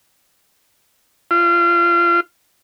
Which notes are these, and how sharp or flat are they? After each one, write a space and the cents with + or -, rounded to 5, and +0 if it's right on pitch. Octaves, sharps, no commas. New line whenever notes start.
F4 -30